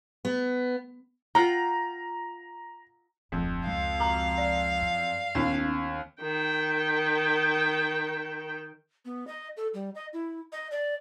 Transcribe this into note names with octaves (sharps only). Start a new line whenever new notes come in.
B3
F4 F#5 G5 A#5
D1 F2 D4
C#2 G#3 F5
F#4 A#5 F6
D5
F#2
D#2 B3 C#4 G#6
D#3 G5
B3
D#5
A4
G3
D#5
E4
D#5
D5